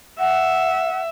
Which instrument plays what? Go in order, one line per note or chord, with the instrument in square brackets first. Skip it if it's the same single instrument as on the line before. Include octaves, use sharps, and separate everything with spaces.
[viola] E5 [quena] F#5